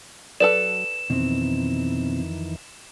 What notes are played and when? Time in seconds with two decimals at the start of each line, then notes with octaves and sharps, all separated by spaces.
0.40 F#3 A4 B4 D5 E7
1.10 F2 B2 D#3 E3 C4